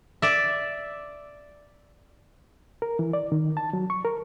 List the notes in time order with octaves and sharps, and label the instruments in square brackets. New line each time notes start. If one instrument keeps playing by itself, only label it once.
[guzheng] D5 E5
[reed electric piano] A#4
E3
D5
D#3
A5
F#3
C#6
A#4